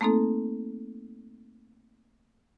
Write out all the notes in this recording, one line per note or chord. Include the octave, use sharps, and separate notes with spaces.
A3 A#3 C4 D#4 A4